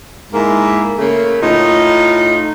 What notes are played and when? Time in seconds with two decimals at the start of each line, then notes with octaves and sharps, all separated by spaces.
0.33 G#2 A#3 E4
0.98 C#3 A3 A#3
1.41 A2 D#4 F4